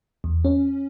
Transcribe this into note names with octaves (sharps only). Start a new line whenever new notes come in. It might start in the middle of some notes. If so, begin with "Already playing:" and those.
E2
C#4